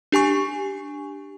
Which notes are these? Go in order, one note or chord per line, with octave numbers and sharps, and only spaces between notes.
D4 G4 G#5 C#6